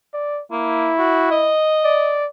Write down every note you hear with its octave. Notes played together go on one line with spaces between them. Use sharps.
D5
A#3 E4
F#4
D#5
D5